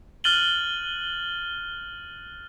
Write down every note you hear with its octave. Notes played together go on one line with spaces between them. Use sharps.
F6 F#6 A6 D#7 F#7 G7